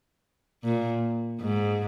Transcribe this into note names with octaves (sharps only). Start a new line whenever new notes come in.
A#2
G#2